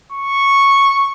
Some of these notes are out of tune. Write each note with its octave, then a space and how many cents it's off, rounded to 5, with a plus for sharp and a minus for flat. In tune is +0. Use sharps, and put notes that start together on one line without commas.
C#6 -5